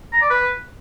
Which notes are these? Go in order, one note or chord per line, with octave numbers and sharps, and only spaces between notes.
A#5
D5
B4